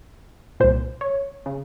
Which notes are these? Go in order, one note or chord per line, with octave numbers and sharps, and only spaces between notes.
C2 A#2 C5
C#5
C#3